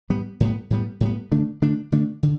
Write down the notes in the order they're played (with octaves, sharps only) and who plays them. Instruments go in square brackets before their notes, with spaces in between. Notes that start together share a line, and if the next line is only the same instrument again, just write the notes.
[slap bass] A2 G3 B3
A2 G3 B3
A2 G3 B3
A2 G3 B3
D3 A3 D4
D3 A3 D4
D3 A3 D4
D3